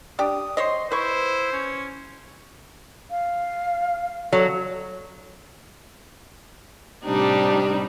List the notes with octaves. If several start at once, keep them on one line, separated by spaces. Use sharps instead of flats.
D4 G4 D#6
C5 C#5 D#5 C6
E4 B4 C5 C#6
C#4
F5
F#3 A4
A2 C3 G3 D4 D#4